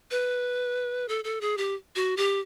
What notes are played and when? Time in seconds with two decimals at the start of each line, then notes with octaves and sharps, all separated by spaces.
0.11 B4
1.08 A4
1.24 A4
1.41 G#4
1.58 G4
1.96 F#4
2.17 G4